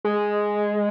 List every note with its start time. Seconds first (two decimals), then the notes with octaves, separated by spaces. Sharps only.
0.05 G#3